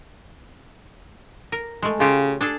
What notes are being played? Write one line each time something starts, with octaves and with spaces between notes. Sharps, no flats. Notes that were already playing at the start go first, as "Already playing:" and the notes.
A#4
G#3 A3
C#3 F4 G4
D4 G#4 A4